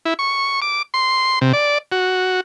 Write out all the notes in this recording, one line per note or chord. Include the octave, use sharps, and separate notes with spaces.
E4
C#6
D6
C6
C3
D5
F#4